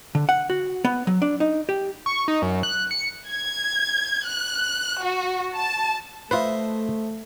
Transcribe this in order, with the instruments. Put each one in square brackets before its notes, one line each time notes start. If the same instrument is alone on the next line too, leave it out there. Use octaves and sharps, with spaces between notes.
[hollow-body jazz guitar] D3
F#5
F#4
B3
F#3
D4
D#4
G4
[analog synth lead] C#6
D#4
F#2
F#6
C#7
[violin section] G#6
F#6
F#4
A5
[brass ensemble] A3 [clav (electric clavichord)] F4 B4 [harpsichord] C5 D#5 E5